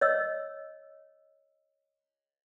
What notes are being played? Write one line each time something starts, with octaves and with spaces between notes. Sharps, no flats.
C#5 D#5 E6